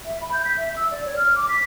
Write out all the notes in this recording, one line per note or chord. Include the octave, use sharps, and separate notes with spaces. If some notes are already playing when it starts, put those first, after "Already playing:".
E5
B5
G6
B6
E5
E6
D5
C#5
F6
D6
B6